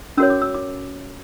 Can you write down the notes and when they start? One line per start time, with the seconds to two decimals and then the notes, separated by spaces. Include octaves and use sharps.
0.17 C#4 F#4 A#4 C#5 E6
0.30 D6
0.42 E6
0.54 D6